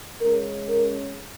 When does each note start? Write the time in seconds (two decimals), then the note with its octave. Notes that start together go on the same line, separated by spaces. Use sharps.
0.21 C#3 G#3 C#4 A#4
0.68 A#4